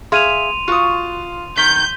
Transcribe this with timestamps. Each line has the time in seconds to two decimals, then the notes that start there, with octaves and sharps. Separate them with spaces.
0.12 G#4 E5 F5 C6 D#7 F7
0.68 F4 F#4 D#6
1.58 D#3 G6 B6